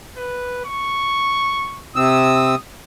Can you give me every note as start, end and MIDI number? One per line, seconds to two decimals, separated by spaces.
0.17 0.63 71
0.65 1.81 85
1.96 2.55 48
1.96 2.55 60
1.96 2.59 87
1.96 2.55 88